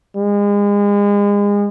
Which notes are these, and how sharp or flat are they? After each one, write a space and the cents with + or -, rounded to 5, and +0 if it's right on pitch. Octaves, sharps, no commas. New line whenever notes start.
G#3 -35